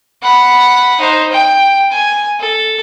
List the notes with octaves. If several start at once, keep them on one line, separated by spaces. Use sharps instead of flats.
F#5 B5
D#4 C5
G5
G#5
A4